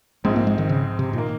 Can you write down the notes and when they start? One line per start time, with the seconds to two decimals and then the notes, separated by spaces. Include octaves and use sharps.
0.24 A#1 G#2 F3 G#3 C4
0.36 A#3
0.47 G#3
0.58 D#3
0.69 C#3
0.99 C3
1.13 A#2 D#3 A#3